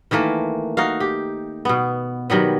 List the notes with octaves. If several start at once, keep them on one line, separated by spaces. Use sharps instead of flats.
D#3 E3 A3 A#3
D#4 F#4 F5
G4
B2 B3
D#3 F#3 G3 B3